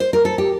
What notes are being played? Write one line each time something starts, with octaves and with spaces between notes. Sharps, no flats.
C5
A#4
A4
G4